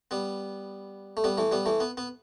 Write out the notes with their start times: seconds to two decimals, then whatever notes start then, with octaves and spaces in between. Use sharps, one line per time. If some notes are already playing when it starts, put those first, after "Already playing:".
0.11 G3 B3
1.17 A3
1.24 G3 B3
1.38 E3 A3
1.52 G3 B3
1.66 E3 A3
1.80 B3
1.97 B3